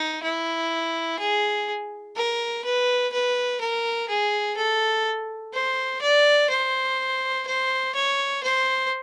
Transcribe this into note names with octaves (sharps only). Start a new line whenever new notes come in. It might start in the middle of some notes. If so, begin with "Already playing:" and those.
Already playing: D#4
E4
G#4
A#4
B4
B4
A#4
G#4
A4
C5
D5
C5
C5
C#5
C5